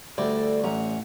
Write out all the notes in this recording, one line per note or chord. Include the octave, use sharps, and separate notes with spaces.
D2 G3 A4 D5
A1 C#4 F#5 A#5